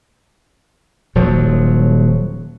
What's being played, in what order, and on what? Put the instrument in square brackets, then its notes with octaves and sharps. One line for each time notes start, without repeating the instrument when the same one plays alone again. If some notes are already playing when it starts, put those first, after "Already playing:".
[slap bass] D#1 F3 F#3